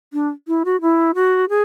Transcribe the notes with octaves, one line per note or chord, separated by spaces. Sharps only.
D4
E4
F#4
E4
F#4
G#4